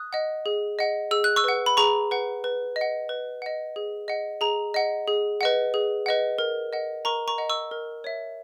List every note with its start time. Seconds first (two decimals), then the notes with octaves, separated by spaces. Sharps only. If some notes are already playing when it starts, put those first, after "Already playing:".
Already playing: D#6 F#6
0.13 D#5 F#5
0.46 G#4
0.79 D#5 F#5
1.11 G#4 E6
1.24 F#6
1.36 C#6 E6
1.44 B4 F#5
1.66 B5
1.77 G#4 A#5 C#6
2.11 B4 F#5
2.44 B4
2.76 D#5
2.81 F#5
3.09 B4
3.42 D#5 F#5
3.76 G#4
4.08 D#5 F#5
4.41 G#4 A#5
4.74 D#5 F#5
5.07 G#4
5.41 B4 D#5 F#5
5.74 G#4
6.06 B4 D#5 F#5
6.39 A#4
6.73 D#5 F#5
7.05 A#4 A#5 C#6
7.28 A#5 C#6
7.38 D#5 F#5
7.50 C#6 E6
7.71 A#4
8.04 C#5 E5